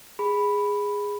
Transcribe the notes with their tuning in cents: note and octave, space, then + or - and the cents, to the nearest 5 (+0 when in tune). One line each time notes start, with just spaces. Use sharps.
G#4 -10 B5 +0